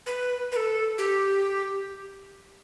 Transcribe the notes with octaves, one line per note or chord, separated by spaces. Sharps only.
B4
B4
A4
G4